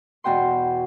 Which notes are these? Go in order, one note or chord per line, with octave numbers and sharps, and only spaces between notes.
E2 B2 B3 F#4 G5 C6